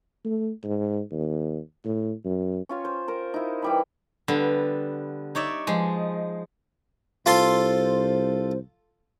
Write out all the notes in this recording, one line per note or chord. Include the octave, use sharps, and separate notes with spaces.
A3
G#2
D#2
A2
F#2
C#4 F4 C#5
C5
A#4 C5
D#4 E4
E3 G3 B5
D3 G3 B3 C6
D#4 C#5 D5 E5
F3 G#3
C2 F4 A4 C5 C6